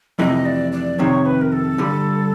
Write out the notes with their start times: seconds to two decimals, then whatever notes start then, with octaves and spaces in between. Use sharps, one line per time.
0.19 F2 C3 E3 A3 D#5
0.46 D5
0.72 D5
0.99 F2 C3 D#3 C#5
1.26 B4
1.41 A#4
1.52 A4
1.78 G2 D3 G3